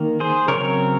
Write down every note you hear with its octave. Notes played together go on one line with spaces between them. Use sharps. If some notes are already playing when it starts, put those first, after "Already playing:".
Already playing: D#3 A#3
G#4 C5
C#3 F#3 C4 A#4 C#5